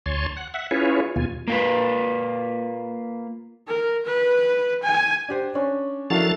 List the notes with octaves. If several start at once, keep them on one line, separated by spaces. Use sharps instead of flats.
D2 C#5 G#5 A5 C6
F#5
E5 F#5
C#4 E4 F4 G#4 B4 C#5
D#2 B2 F4 G#5
A#3 F4 B4
A#4
B4
G#5
D4 G4 C5
C#4 D4 C#5
F3 D4 E4 F#4 A4 A#4 E5 A5